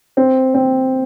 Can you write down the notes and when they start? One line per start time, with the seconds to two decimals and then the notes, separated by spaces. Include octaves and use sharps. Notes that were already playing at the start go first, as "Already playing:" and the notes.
0.17 C4
0.54 C4